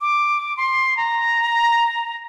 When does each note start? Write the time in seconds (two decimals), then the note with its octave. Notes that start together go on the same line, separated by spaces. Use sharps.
0.01 D6
0.57 C6
0.97 A#5